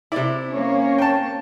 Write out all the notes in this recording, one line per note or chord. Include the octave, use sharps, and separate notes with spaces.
C3 E4 D5
A#3 C#4 C#5
G5 A5